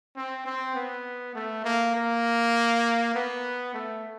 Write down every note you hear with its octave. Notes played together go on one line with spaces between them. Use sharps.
C4
C4
B3
A3
A#3
A#3
B3
A3